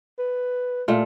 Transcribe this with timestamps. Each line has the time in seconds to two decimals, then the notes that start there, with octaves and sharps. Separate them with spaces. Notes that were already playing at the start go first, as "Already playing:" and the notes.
0.19 B4
0.88 A#2 A3 F4